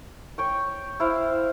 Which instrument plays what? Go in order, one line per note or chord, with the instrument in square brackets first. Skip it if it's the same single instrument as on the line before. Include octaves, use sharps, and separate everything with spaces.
[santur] C#5 G5 C#6
E4 C5 F5